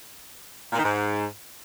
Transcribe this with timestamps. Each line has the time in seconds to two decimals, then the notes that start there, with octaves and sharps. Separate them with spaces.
0.73 A#2
0.78 D#3
0.83 G#2